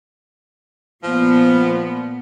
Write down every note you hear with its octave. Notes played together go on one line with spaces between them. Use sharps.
A#2 F3 B3